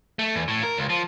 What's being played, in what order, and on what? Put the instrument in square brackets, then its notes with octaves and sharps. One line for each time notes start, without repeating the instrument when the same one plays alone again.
[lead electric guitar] A3
E2
A2
A#4
C#2
F3